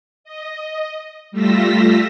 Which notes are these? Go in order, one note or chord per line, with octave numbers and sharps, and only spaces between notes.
D#5
G3 A3 F4 E6 A#6 B6